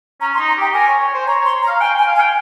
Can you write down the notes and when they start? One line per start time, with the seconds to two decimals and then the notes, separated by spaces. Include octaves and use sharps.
0.21 C#4 A#5
0.34 C6
0.39 D#4
0.48 A#5
0.57 G4 G5
0.74 A#4 G#5
0.88 C#5
1.00 C#5
1.14 C5
1.27 C#5 A#5
1.41 C#5 C6
1.62 A#5
1.68 F5
1.80 G5 G#5
1.94 G5 G#5
2.08 F5
2.16 G#5
2.20 G5